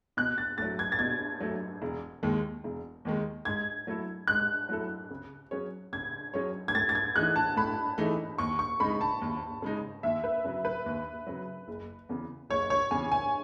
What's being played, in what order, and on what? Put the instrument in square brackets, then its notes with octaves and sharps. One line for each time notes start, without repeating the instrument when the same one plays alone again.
[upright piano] B2 [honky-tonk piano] F#6
[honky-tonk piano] A6
[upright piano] F#3 A3 [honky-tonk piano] A6
[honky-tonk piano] G#6
A6
[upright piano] B2 [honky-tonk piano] G#6
[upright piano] F#3 A3
E1
D#2 D#3 G#3
E1
D#2 D#3 G#3
[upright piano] G#2 [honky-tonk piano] G#6
[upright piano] F#3 A3 E4 A4
[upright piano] G#2 [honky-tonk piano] F#6
[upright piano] F#3 A3 E4 A4
C#3
F#3 C#4 G#4 C#5
[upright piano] C#3 [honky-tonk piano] G#6
[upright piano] F#3 C#4 G#4 C#5
[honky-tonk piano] G#6
[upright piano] A2 [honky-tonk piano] A6
[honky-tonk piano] A6
G#6
[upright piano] E3 A3 D#4 G#4 [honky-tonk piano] F#6
[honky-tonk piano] A5
[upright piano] A2 [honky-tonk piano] B5
[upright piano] E3 A3 D#4 G#4
[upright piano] D#2 [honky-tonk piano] C#6
[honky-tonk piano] C#6
[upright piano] C#3 G#3 D#4 [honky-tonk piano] B5
[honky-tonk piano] A5
[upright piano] D#2
C#3 G#3 D#4
[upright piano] D#2 [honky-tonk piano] E5
[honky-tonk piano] B4
[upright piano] C#3 F#3
[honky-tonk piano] B4
[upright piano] D#2
C#3 F#3
F#1
E2 C#3
[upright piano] F#1 [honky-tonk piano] C#5
[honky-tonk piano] C#5
[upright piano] E2 C#3 [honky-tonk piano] G#5
[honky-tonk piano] G#5